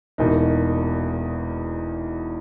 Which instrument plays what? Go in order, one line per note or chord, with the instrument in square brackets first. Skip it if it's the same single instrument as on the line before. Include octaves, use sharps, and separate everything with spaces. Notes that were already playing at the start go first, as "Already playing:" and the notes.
[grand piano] E1 E2 B2 A#3 D#4